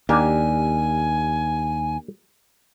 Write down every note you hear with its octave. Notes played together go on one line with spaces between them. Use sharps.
D#2 A#3 D4 G4 G#5